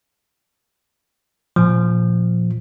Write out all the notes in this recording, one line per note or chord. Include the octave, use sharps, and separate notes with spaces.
A#2 F3